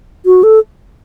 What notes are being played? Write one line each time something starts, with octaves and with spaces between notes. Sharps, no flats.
F#4
A4